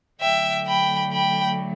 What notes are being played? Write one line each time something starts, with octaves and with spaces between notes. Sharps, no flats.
D3 F#3 A3 E5 G5
G5 B5
G5 B5